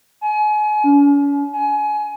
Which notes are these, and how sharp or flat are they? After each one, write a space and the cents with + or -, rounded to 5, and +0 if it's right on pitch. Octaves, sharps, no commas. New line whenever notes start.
G#5 +35
C#4 +40
G#5 +25